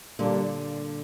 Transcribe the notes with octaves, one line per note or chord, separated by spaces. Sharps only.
A#2 D3 G3 A#3 D4